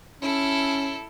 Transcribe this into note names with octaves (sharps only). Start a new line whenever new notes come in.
C#4 E4 A4